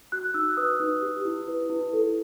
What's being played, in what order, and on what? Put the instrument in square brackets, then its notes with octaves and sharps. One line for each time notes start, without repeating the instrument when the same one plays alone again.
[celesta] F#4 F#6
D#4 E6
B4 D#6
D#4
G4
E4
B4
E4
A4